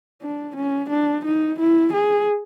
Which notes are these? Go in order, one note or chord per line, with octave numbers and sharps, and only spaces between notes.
D4
C#4
D4
D#4
E4
G#4